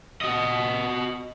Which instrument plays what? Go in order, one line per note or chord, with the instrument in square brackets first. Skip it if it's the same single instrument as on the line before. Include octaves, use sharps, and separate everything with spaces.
[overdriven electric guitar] F#4 D#5